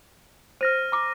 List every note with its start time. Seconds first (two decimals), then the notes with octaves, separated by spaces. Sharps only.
0.61 C5 F6 A#6 D#7
0.92 A#5 D6